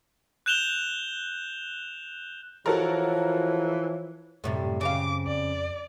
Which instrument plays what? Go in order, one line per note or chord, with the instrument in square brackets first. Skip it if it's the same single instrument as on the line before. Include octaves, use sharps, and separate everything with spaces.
[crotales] F#6 G6 E7 F7 G7
[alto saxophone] E3 [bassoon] F3 [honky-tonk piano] F#4 A4 A#4 [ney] C#5
[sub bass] F#2 [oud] A2 C3 G3
[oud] C#3 C4 F5 [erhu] D6
[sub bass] F2 [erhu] D5